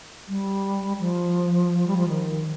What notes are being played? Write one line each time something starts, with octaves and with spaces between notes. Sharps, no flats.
G3
F3
G3
F3
D#3